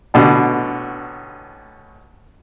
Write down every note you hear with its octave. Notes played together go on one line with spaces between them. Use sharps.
A1 B2 D3